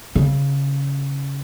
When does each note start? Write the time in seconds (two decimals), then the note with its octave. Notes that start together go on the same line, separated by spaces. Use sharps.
0.15 C#3